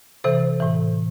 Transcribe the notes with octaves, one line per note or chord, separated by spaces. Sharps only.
C3 E3 A4 C5
A2 E3